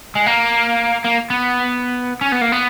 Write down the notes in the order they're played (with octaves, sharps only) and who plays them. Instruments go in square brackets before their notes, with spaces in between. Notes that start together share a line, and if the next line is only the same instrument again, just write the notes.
[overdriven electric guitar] G#3
A#3
A#3
B3
C#4
B3
A#3
B3